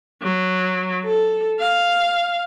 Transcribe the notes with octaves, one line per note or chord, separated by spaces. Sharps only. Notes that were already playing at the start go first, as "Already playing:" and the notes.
F#3
A4
F5